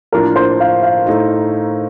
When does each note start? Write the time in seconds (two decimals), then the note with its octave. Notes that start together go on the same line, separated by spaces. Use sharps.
0.13 A2 F3 A#3 D4 F4 A#4
0.36 C5
0.60 F5
0.83 F5
1.07 A2 A3 D#4